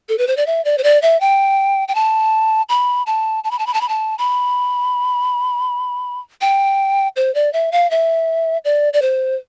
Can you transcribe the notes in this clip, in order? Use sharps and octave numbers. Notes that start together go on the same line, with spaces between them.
A4
B4
C5
D5
E5
D5
C5
D5
E5
G5
G5
A5
B5
A5
A5
B5
A5
B5
A5
B5
A5
B5
G5
C5
D5
E5
F5
E5
D5
D5
C5